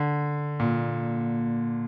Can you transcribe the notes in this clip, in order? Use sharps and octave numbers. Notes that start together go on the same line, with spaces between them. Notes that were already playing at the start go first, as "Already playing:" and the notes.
Already playing: D3
A#2